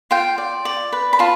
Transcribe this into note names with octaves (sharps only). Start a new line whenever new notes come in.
F4 G5
D5
D5
B4
B5
F4 A5